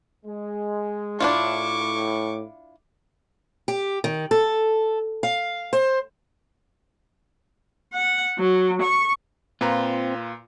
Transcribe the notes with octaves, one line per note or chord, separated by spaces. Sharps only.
G#3
A2 D4 E4 F4 C#6 D6
G4
D#3
A4
F5
C5
F#5
F#3
C#6
A#2 C4 F4 B4 A#5